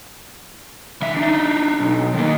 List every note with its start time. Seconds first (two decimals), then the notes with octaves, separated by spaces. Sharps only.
1.02 D#3 E5
1.17 D4 D#4
1.80 B1
2.14 D#3 A#3